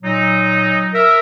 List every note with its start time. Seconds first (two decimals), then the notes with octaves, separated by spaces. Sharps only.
0.03 A#2 F#3 D#4
0.94 A#4 E5